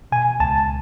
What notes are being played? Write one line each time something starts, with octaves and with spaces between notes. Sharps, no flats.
B2 G#5
C#2 A5